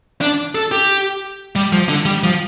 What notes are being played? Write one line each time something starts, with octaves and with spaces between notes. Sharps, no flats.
D4
A4
G4
G3
F3
D3
G3
F3